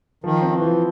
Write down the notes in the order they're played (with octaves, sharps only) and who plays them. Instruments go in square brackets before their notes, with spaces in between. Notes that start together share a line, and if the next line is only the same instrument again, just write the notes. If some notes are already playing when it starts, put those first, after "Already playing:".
[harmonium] D#3 [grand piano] F3
[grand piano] C4
[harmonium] E3
[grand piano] F3